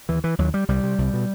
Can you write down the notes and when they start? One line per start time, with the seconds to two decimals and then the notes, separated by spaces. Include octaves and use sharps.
0.09 D#2 E3
0.24 E3
0.38 D#2 F#3
0.54 G3
0.68 C2 G3
0.83 C3
0.98 C2
1.13 B2